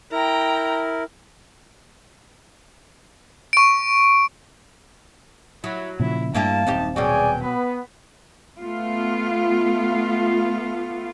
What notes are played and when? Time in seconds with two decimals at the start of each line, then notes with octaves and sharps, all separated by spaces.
0.12 E4 A#4 G5 A#5
3.53 C#6 D7
5.64 F#3 E4
6.00 A#2 C#3 F3 E4
6.34 G2 A#3 D4 E4 G4 A5
6.67 D#1 F#2 C4 D#4 G4
6.96 B2 F#3 F#4 G#4 D5 G5 G#5
7.43 B3 B4
8.61 A3 B3 F4